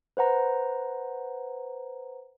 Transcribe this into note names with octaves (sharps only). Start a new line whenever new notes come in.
B4 C5 F#5 A#5